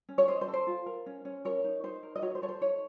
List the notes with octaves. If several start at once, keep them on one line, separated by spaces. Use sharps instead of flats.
C#4
C#5
C#4 C5 D#5
C5
A4
C5
F4
A#4
C#4
C#4
A#4 C#5
D#4
D#4 C5
A#4
D#5
F#4 C#5
C5
A4 C#5
C5
D#4 C#5